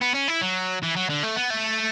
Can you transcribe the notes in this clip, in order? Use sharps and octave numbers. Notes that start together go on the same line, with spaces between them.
B3
C#4
E4
F#3
E3
F#3
D3
A3
B3
A3